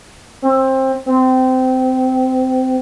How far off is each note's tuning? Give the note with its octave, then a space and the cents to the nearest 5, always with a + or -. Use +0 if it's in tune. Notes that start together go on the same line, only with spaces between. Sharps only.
C4 +20
C4 -20